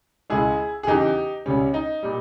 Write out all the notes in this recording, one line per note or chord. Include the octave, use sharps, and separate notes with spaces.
C#2 C#3 G#3 E4 G#4
G#4
E2 C#3 E3 D#4 G4
C#2 C#3 G3 C#4
D#4
A#2 G3